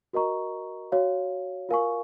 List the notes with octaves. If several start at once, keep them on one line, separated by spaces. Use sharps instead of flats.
F#4 A#4 D#5 A#5 C#6
F#4 C#5 F5
F4 A#4 F5 G#5 C#6